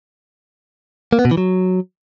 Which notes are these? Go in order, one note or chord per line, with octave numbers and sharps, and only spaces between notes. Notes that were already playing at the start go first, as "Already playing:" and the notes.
A#3
B3
B2
E3
F#3